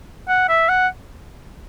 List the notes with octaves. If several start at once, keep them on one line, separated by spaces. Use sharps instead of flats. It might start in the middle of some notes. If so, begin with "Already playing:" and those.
F#5
E5
F#5